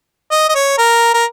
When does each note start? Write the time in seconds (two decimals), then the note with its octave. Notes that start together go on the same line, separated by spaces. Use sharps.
0.31 D#5
0.49 D#5
0.55 C#5
0.78 A#4
1.14 A#4